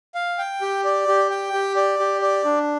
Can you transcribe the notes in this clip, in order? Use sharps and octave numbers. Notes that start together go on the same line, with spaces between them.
F5
G5
G4
D5
G4
G5
G4
D5
G4
D5
D4